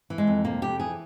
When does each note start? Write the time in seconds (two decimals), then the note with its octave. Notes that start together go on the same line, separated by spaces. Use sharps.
0.10 E3
0.18 G#3
0.27 F2
0.45 C3 A#3
0.62 F2 G4
0.80 E3 G#4